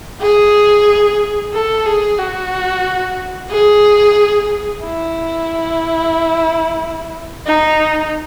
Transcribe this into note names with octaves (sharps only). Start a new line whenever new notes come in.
G#4
A4
G#4
F#4
G#4
E4
D#4